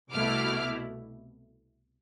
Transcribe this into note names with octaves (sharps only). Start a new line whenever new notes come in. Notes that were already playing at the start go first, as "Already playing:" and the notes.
C2 B2 A3 E4 D6 F6